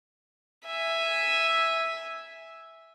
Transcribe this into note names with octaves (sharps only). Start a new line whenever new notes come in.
E5 G#5